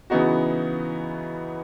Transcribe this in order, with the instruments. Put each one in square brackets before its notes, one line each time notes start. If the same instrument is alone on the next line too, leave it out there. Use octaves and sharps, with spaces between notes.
[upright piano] C#3 E3 B3 D#4 F#4